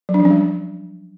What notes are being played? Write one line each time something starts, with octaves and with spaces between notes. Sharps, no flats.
F#3
D4
F3
C#4
G3